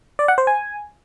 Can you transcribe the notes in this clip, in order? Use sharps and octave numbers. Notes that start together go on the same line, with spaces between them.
D5
F#5
C5
G#5